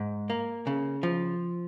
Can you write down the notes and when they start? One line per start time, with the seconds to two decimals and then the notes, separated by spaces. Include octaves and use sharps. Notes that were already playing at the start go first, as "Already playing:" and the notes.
Already playing: G#2
0.30 A#3
0.67 C#3
1.03 F3